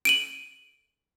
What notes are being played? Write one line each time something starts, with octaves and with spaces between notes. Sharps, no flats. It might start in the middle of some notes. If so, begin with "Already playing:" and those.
D7 D#7 F#7